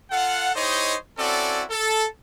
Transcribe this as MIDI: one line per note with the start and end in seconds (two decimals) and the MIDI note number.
0.11 0.50 65
0.11 0.50 69
0.11 0.50 77
0.11 0.50 78
0.56 0.95 63
0.56 0.95 64
0.56 0.95 67
0.56 0.95 72
0.56 0.95 73
0.56 0.95 75
1.18 1.63 60
1.18 1.63 61
1.18 1.63 64
1.18 1.63 66
1.18 1.63 69
1.18 1.63 74
1.69 2.04 69